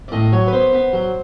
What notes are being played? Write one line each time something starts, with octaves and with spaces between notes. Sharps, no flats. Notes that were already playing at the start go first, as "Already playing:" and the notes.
D5
A2 D#5
F#3 C#5
B4
B3 C5
B3
F#3